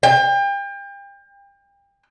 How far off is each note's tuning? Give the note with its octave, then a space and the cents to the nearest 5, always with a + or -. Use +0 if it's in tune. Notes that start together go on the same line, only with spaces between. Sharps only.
G5 +35